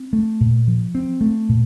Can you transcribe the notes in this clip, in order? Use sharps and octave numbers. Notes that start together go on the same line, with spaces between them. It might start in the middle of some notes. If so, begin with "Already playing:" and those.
Already playing: C4
A3
A#2
F3
C4
A3
A#2